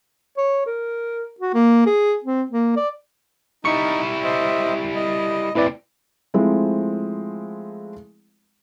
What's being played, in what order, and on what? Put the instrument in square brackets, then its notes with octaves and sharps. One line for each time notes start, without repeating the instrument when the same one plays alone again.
[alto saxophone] C#5
A#4
F#4
A#3
G#4
C4
A#3
D5
[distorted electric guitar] G3 E4 [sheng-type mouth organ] D#4 [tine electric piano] C#6 C#7
[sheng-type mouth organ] C5 D#5 E5
D#5
[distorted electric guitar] A2 C3 [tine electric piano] E4 B4 D5
[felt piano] F3 G#3 A3 C4 E4